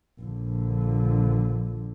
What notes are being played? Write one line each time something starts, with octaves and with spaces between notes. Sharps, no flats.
A#1 D3